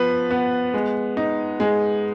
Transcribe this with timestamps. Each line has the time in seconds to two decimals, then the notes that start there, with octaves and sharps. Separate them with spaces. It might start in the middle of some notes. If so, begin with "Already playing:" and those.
Already playing: F3 B3 B4
0.31 B3
0.74 G#3
1.17 D#4
1.60 G#3